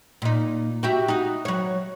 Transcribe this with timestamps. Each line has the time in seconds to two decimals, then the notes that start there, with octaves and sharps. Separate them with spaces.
0.22 A#2 D#4
0.83 F#4 G4 E5
1.08 D#4 F#4
1.45 F#3 C#5